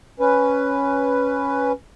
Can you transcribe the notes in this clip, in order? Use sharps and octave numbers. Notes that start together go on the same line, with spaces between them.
C#4 B4